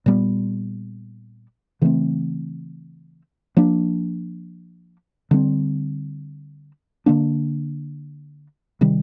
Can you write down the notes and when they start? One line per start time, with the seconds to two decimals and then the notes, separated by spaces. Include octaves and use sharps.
0.06 A#2 G3 B3
1.82 C#3 E3 A3 C4
3.57 F3 A#3 D4
5.31 D3 G3 C4
7.06 D3 F3 A#3 D4
8.81 C3 D#3 G3